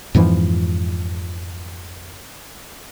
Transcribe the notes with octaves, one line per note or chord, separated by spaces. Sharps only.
F2 G#2 E3 F3